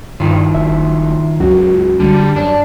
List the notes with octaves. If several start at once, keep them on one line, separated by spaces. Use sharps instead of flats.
G2 D#3 F3
F#1 E5
C#2 F#2 F#4
D3 G3
F#2 D4